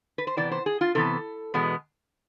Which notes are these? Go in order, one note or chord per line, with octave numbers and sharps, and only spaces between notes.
B4
C5
C3 E3 B3 D5
C5
G#4
F4
C3 E3 B3 A4
E2 B2 G#3 B3